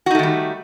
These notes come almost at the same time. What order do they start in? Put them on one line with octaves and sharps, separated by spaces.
F#4 D#4 A3 D#3 G3